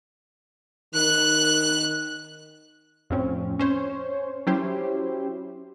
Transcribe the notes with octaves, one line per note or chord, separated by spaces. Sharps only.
D#3 F#6
F2 A2 F3 C4 C#4
C#4 C5 C#5
F#3 C#4 E4 G4 C5